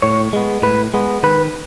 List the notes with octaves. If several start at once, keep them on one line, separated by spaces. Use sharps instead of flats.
A2 C#5
G#3 B3
A2 B4
G#3 B3
D#3 B4